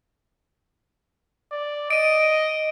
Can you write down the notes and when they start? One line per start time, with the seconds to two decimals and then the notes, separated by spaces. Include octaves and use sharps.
1.51 D5
1.90 D#5 D7 D#7